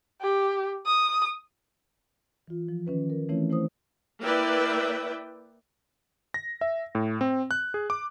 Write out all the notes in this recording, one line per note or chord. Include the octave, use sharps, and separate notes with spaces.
G4
D#6
E3 F4
F3
D#3 C#4 B4
A#4
E3 A3 C4 C#4 E4 C#5
A3 E4 C5 D#6
A#3 E4 B4 D5 E5 G5
A#6
E5
A2
C4
F#6
G#4
D6